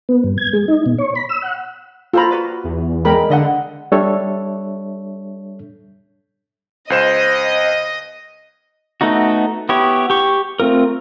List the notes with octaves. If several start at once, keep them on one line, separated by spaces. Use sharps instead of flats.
B3
G2
G#6
G#3
D#4
B2
C#5
B5
E6
F#5
F4 A4 C5 A#5 B5
F#4 B4 D5
E2
G#3 A#4 D5 G5 B5
D3 D5 D#5 F#5
G3 D4 A4 C#5 E5
C#2 C5 D#5 E7
A3 B3 D#4 F#4
B3 E4 G4 C#5
G4 C#6
A3 C4 F4 A#4